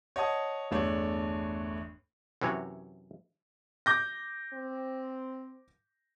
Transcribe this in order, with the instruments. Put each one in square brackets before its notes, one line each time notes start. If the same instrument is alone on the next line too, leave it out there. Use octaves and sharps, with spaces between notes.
[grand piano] C#5 D#5 F#5 A5 D#6
G1 E2 A3 D4 C#5
[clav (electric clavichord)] F#2 C3 E3 F#4 C#5
[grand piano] D6 G6 A#6
[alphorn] C4